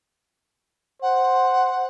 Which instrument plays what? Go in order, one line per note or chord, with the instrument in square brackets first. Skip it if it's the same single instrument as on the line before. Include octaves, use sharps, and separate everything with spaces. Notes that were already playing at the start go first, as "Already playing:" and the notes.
[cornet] C5 [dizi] F#5